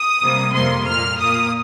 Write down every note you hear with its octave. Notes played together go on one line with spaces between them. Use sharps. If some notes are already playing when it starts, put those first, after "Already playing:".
Already playing: D#6
C3 G3 A#3
F2 C3 G3 A#3 C6
A#2 A#3 F6
A#2 A#3 D#6